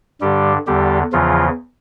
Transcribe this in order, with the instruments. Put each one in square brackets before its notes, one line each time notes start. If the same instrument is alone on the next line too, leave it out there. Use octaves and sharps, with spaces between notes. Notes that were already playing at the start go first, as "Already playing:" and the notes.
[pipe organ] G2 D3 G3 G4
E2 D3 G3 G4
E2 C#3 E3 F3 F4